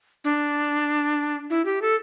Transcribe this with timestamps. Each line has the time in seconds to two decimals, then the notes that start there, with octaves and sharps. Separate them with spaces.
0.24 D4
1.50 E4
1.65 G4
1.82 A4